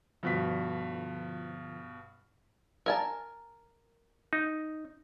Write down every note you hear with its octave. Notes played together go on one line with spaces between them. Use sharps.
G2 B2 D3 F3 B6
A#4 G#5 A5
D#4